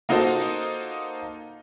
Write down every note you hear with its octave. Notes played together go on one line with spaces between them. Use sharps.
A#3 D#4 F4 F#4 A4 C5